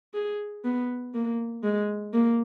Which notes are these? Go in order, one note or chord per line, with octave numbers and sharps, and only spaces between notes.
G#4
B3
A#3
G#3
A#3